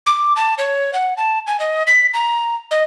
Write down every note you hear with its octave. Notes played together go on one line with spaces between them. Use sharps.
D6
A5
C#5
F#5
A5
G#5
D#5
B6
A#5
D#5